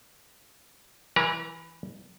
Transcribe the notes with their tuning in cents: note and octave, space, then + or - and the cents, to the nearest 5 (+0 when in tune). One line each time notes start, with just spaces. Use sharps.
E3 +0 A#4 +45 A#5 +0